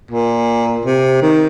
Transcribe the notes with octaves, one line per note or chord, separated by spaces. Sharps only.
A#2
C3
D#3